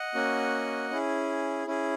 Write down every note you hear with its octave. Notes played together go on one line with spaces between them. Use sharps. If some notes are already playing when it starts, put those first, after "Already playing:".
Already playing: D#5 F#5
A#3 C#4 F#4
C#4 E4 G#4
C#4 E4 G#4